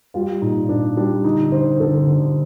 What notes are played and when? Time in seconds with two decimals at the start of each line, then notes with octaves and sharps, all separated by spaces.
0.14 G3 F4
0.42 A#2 D#4
0.69 A#2 D4
0.97 G3 D4
1.24 D3 D#4
1.52 D3 C5
1.80 D3 A4
2.07 D3